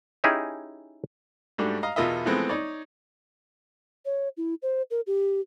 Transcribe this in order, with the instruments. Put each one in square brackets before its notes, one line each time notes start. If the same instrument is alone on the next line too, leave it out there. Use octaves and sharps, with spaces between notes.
[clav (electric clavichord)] C#4 D#4 E4 G4 G#4
[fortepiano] G#2 G3 A3 D4 F#4 G4
D#5 F5 A#5
E2 B2 F4 A#4 D#5 E5
E3 F3 G#3 A3 B3 C4
D#4 C#5 D5
[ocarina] C#5
E4
C5
A#4
G4